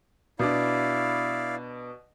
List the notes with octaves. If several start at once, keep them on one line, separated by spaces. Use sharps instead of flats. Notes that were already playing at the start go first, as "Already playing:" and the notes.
B2 D4 E4 D5 F5